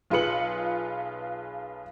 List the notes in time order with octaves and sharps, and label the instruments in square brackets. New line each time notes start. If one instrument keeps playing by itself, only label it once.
[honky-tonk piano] B1 F4 G#4 B4 C#7 F#7